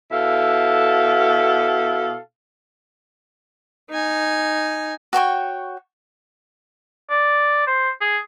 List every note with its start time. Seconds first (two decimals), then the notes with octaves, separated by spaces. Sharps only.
0.12 B2 E4 A4 F5
3.90 D#4 G#5
5.13 F#4 C#5 G5 C#6
7.10 D5
7.67 C5
8.01 G#4